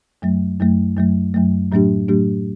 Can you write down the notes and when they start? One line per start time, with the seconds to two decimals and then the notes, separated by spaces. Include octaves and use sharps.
0.22 F#2 F#3 A3
0.60 F#2 F#3 A3
0.97 F#2 F#3 A3
1.34 F#2 F#3 A3
1.72 A2 F#3 A3 D4 G4
2.08 A2 F#3 A3 D4 G4